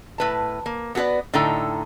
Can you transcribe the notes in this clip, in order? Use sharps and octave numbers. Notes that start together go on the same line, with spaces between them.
A2 B4 A5
A#3
B3 F#4 G#4 B4 D5
A2 D3 D#4 A4 G5 A#5